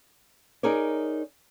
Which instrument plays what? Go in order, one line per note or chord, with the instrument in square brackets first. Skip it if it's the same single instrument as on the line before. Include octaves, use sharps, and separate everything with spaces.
[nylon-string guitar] D#4 G#4 A#4 C#5 D5